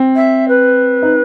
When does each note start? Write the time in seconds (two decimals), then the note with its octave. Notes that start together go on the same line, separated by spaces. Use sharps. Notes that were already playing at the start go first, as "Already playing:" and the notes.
Already playing: C4
0.16 E5
0.48 B4
1.03 D#4